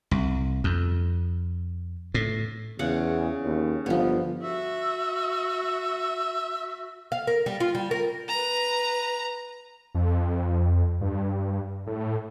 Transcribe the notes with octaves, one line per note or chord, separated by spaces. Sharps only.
C2
F2
A2
E2 C#3 F#5
D#2
G1 F3 B3
F#4 E5
F5
A#4
G3
F4
G3
A#4
B4 A#5
F2
G2
A2